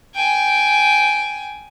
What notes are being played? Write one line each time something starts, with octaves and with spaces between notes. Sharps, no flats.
G5 G#5